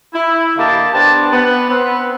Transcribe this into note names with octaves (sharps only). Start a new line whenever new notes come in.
E4
D3 A#3 G4 D#5 F5 A5
B3 C4 D4 G4 A5
B3
B3 C4 B4